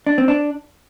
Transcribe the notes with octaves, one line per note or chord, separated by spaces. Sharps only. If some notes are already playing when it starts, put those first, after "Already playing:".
D4
C4
D4